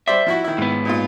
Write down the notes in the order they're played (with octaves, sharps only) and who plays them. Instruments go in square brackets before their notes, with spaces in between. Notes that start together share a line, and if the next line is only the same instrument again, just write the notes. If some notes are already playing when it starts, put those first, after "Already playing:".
[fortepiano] G3 C5 D5 [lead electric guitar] E5
[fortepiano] F3 E4 F#4
D#3 E4
[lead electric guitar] G#2 B3
[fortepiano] A#2 D#4 F4